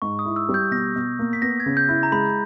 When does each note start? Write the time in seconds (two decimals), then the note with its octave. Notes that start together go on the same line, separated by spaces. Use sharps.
0.02 G#2 C#6
0.19 D#6
0.25 E4
0.36 E6
0.49 G3
0.54 G6
0.71 B2 A#6
0.96 B2
1.19 A#3
1.33 B6
1.42 B3 A#6
1.60 G#6
1.66 C#3
1.77 G6
1.89 E4
2.03 A#5
2.12 G#3 B5